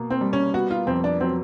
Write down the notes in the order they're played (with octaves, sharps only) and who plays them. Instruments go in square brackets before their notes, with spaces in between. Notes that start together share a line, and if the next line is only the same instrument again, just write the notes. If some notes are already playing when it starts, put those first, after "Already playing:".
Already playing: [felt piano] B2 A#3
[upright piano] C4
[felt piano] G3
[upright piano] C#4
[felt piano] B3 [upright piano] F#4
[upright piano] F4
[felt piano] F2 [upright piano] C4
[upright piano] D4
[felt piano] F#3 [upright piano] C4